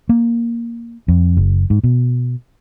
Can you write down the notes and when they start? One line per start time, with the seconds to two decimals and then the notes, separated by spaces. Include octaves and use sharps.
0.09 A#3
1.08 F2
1.37 F#1
1.70 G#2
1.84 B2